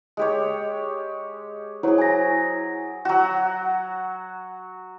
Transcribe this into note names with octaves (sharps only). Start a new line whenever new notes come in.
G#3 G4 C#5
F#3 E4 G#4 C5 C#5
G#5 A#6
F#3 F#4